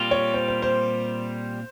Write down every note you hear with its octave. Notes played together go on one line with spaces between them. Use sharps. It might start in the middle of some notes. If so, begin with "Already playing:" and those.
Already playing: A#2 G3 C4 F4
C#5
C5
C5
C5